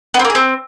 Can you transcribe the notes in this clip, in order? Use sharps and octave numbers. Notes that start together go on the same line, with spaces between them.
B3
C4
A#3
G#4
C4